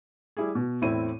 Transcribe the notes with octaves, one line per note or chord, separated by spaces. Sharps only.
G3 E4 G#4
B2
E2 A2 C4 E4 D#7